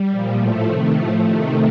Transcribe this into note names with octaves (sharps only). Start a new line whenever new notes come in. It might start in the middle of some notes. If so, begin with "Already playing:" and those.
Already playing: G3
A#2 F3
A2 F3 A3
C3 D#3
A2 F3 A3
C3 D#3